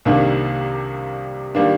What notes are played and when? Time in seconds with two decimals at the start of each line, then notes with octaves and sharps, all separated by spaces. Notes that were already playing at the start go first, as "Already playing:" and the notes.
0.05 C2 C3 D#3 A#3 D4
1.55 D#3 G3 A#3 D4